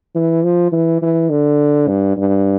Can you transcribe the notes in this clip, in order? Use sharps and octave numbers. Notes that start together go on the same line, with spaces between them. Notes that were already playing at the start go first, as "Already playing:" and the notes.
E3
F3
E3
E3
D3
G2
G2